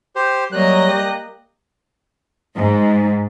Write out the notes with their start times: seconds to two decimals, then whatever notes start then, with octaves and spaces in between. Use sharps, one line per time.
0.16 G4 C5
0.52 F#3 G3 A#3 D#5 F#6
0.88 G4
2.55 G#2